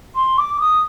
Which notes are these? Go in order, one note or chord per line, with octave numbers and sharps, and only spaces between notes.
C6
D6
D#6